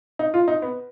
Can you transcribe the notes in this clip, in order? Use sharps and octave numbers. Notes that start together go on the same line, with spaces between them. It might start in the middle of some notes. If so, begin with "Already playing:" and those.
D#4
F4
D#4
B3